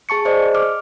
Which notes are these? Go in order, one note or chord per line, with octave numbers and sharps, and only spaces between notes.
G#4 A5 C#6 C#7
G#4 C5 D5 D#5
D6 F6